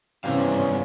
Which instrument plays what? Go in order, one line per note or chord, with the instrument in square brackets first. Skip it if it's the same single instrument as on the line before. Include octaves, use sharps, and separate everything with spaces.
[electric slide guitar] G2 B3 F5 [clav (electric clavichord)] C3 E3 G3 [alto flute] C#4